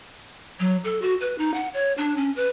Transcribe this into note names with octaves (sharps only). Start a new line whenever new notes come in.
F#3
A4
F#4
B4
D#4
F#5
C#5
D4
C#4
B4